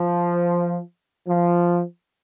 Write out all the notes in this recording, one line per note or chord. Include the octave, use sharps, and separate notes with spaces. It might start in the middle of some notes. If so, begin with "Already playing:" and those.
Already playing: F3
F3